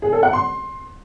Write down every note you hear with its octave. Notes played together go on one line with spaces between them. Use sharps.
G#4
A4
F#5
C6